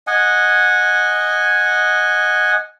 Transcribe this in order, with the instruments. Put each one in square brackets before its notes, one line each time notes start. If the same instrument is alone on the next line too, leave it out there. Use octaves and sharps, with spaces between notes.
[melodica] D#5 F#5 G#5